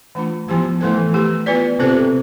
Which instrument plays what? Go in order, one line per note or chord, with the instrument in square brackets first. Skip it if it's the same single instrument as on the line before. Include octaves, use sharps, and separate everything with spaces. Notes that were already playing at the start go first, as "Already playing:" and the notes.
[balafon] E3 A3 D4 F4
[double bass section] F3 [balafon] B3 E4 G4 C5
[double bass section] E3 [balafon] A3 E4 A4 C5
[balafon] A3 E4 G4
B3 F4 B4 D5
[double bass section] C3 [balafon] C4 F4 A4 C5